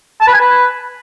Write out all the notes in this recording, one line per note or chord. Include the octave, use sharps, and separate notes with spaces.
A5
B4
G#5
B4